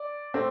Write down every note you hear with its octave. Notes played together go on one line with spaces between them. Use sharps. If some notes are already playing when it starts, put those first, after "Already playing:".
Already playing: D5
A3 C4